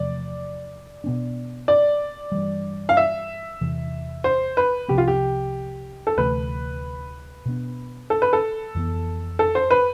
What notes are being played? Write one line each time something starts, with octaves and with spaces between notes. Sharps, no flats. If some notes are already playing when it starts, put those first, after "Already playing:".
Already playing: E2 C3 F3 A3 D5
B2 B3 D4
D5
G2 E3 G3
F5
E5
E2 C3 E3
C5
B4
C2 C3 F3 C4 G4
F4
G4
A4
D2 C3 E3 A3 B4
B2 B3 D4
A4
B4
A4
F2 E3 B3
A4
C5
B4